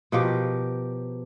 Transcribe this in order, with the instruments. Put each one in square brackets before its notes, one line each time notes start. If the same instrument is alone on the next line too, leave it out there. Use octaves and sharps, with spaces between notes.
[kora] B2 F3 G4 A#4